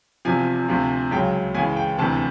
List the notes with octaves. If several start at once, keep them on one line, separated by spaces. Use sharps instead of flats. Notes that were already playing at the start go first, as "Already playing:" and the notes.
E2 C3 F3 G#5
D2 C3 F3
C#2 C#3 F#3 G5
C#2 C#3 E3 G#5
G5
E1 D2 C3 E3 A5